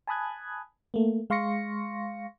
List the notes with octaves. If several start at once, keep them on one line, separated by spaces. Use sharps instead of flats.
G#5 A5 B5 D#6 F#6 G#6
A3 A#3
G#3 F5 C6 C#6 A#6 C#7